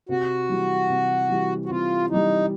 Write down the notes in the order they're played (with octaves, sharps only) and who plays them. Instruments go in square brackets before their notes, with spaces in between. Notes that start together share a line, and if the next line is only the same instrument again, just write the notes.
[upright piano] C3 [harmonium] F#4
[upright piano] E3 G3
C3
E3 G3
[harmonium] F#4
[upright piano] C3 [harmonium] F4
[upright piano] E3 G3 [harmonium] D#4